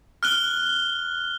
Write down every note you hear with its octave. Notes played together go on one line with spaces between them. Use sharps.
F6 F#6 G7